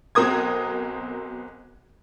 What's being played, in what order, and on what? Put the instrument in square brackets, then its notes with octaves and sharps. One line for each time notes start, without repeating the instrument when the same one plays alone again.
[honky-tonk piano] B1 B2 C4 A#4 D#6 G#6